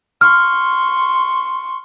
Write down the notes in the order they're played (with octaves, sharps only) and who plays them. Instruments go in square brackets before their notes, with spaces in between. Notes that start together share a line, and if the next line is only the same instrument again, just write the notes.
[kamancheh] C6 C#6 [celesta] F6